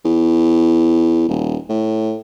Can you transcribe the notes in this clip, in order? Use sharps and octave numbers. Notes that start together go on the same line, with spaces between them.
E2
D#1
A2